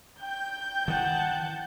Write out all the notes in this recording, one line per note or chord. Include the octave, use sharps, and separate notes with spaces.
G5 G6
D#3 E3 F#5 A5